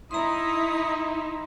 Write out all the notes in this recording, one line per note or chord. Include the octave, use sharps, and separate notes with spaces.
D#4 E4 A#5 C6 D#6